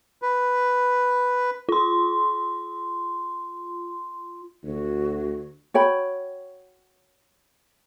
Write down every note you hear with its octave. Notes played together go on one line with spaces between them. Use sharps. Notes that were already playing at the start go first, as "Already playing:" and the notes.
B4
F4 C6
D2 F#4
F#4 C#5 G5 B5